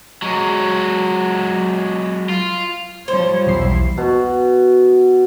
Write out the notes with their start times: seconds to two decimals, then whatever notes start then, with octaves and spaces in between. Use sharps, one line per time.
0.22 F#3 G#3
2.29 F4
3.08 F3 G3 C5 C#5
3.47 B1 E2 G3 E4 C7
3.98 B2